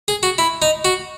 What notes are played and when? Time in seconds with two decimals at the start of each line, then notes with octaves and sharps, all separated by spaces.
0.08 G#4
0.23 F#4
0.38 E4
0.62 D#4
0.85 F#4